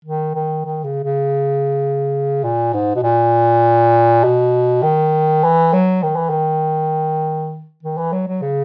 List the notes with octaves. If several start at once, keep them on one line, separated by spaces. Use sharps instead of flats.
D#3
D#3
D#3
C#3
C#3
A#2
G#2
B2
A#2
B2
D#3
E3
F#3
D#3
E3
D#3
D#3
E3
F#3
F#3
C#3